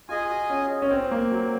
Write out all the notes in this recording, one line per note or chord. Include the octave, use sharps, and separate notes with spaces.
F4 G#4 D#5 G#5
F#4
C#4
C#4
C4
A#3
F#3